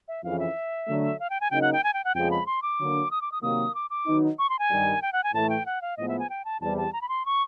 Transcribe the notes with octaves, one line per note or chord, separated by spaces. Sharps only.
E5
F2 C#3 E3 F5
E5
D3 F#3 A3
F5
G5
G#5
C#3 F#3 A#3 D#4 G5
F#5
G5
G#5
G5
F#5
F2 C#3 F3 G#3 B3 G5
B5
C6
D6
D3 F#3 A#3 D4
D#6
D6
D#6
C3 D#3 F#3 A#3 D#6
D6
D6
D#3 F#3 B3 D#4
C#6
C6
G#5
G2 D#3 G3
G5
F#5
G#5
A2 E3 A3 A5
G5
F#5
F5
A2 F3 G#3 B3 D#5
E5
G#5
G5
A5
E2 C3 E3 G3 A5
A5
A#5
B5
C6
C#6